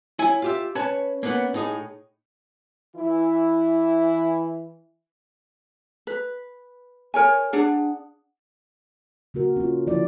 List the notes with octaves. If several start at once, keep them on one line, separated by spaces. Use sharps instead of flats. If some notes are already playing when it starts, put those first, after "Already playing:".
E4 C#5 G#5
F4 G4 E5
C#4 B4 C#5 A5
A#3 B3 C#4 B4 F#5
A2 D#4 G#4
E3 E4
B4
A#4 C#5 G#5
D4 G#4 F#5
C#3 A#3 F#4 A#4
C#4 F4
D3 F3 A#3 E4 D5